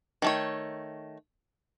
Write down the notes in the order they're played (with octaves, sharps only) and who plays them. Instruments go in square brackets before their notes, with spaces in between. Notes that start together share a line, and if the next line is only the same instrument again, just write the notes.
[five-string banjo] D#3 A3 C#5